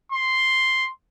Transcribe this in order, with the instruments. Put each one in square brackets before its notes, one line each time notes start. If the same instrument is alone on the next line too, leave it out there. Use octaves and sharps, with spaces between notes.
[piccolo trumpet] C6